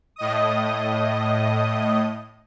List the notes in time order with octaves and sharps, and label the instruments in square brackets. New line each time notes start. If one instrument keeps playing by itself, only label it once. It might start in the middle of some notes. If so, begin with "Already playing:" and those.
[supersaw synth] A2 D#5 D#6